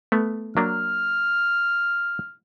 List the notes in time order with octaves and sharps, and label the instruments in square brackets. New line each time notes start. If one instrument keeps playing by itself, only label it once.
[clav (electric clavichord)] A3 B3
[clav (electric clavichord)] F#3 A#3 D4 [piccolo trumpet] F6